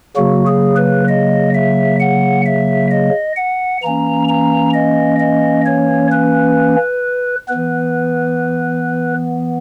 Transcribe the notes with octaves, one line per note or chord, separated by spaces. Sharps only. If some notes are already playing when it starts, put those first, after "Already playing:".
C#3 F#3 A#3 F#4
G#4
B4
D#5
E5
F#5
E5
D#5
F#5
E3 A#3 C#4 A#5
A#5
D#5
D#5
C#5
B4
E3 B3 B4